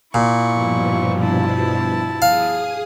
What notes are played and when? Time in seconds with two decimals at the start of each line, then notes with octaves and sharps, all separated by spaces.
0.14 A#2 E4 C#6
0.50 G2 B2 F3
1.19 E4 A5
2.22 G#4 F5 D#6